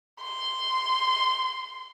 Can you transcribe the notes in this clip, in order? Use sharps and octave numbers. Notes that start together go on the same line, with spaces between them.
C6